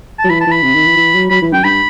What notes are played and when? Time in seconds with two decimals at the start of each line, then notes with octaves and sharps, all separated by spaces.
0.19 A5
0.24 F#3
0.30 E3 B5
0.41 A5
0.47 E3 B5
0.63 C3
0.75 D#3
0.86 E3
0.97 E3
1.14 F#3
1.30 F#3 B5
1.42 E3
1.53 F#2 G5
1.64 G2 B5